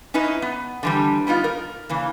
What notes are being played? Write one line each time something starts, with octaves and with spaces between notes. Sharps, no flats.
C#4 D#4 E4 B4 D#5
B3
D3 E3 G3
G3 B3 D#4 F4
A#4
C#3 E3 A#3